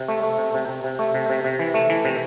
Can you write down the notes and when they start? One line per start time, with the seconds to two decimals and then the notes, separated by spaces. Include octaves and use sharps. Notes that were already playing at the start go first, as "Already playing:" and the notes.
Already playing: C3
0.08 A3
0.23 A3
0.38 C3
0.54 C3
0.69 C3
0.84 C3
0.99 A3
1.14 C3
1.30 C3
1.44 C3
1.59 E3
1.74 A3
1.90 E3
2.05 C3